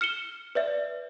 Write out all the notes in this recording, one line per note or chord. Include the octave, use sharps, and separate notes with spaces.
F6 C#7 E7 G7
B4 D5 E5